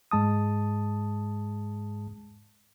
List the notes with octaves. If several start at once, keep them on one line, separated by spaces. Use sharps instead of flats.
G#2 G#3 A5 D#6